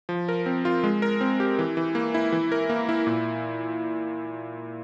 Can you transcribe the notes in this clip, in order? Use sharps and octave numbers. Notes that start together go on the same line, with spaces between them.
F3
A#4
C4
F4
G#3
A#4
C4
G4
E3
E3
A#3
E4
E3
A#4
A#3
E4
A#2